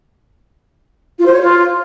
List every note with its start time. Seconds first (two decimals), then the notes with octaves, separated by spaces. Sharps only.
1.19 F4
1.26 C5
1.33 C#5
1.40 F4